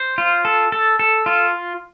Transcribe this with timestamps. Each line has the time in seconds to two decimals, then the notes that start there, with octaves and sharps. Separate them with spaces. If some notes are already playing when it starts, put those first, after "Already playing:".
Already playing: C5
0.18 F4
0.45 A4
0.72 A4
0.99 A4
1.26 F4